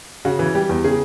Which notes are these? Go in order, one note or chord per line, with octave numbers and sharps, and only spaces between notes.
C#3 F#4
E3
G3 G4
E2
C#3 G#4